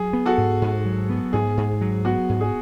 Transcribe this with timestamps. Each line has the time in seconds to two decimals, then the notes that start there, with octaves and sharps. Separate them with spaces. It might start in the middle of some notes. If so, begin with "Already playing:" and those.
Already playing: F#3 G#4
0.13 B3
0.25 F#4 A4
0.38 G#2
0.62 G#2
0.86 F#3
1.10 B3
1.33 G#2 G#4
1.57 G#2
1.81 F#3
2.05 B3 F#4
2.29 G#2
2.41 G#4